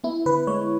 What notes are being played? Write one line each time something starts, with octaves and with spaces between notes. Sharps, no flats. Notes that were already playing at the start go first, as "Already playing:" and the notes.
B3 E4
D3 B4
G#3 C#5